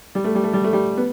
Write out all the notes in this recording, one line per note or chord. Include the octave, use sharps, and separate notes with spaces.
G3
A3
G3
A3
G3
A3
G3
B3